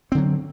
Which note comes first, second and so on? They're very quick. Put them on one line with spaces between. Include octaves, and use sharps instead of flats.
C4 D3 F#3